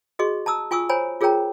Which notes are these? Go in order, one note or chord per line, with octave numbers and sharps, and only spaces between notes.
F#4 G#4 D#5 C#6
A5 A#5 D#6 E6
F4 G#5 C#6 D#6 E6
C5 C#5 G#5 A#5 B5
F4 G#4 A#4 C#5 G5 A#5